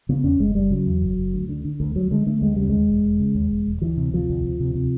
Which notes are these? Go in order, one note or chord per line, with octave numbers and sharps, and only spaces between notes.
C#3 B3
E2 C#4
F#1 G#3
F#1 G3
C#3 F#3
E2
F#1
F#1
D2
D3
D3
D2
D2 F#3
D3 G#3
D3 A3
D2 G#3
C#3 G3
D#2 G#3
E1
E1
C#3
D#2
E1
E1
D2 E3
C3
C3 F3
D2
D2
C3
C3